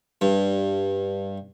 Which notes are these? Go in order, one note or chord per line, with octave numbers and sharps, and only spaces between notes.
G2